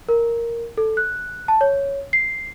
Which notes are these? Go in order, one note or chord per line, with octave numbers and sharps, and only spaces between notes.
A#4
A4
F#6
A5
C#5
C7